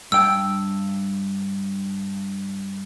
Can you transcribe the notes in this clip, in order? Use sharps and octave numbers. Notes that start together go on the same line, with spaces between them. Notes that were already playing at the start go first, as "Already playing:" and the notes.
G2 G5 E6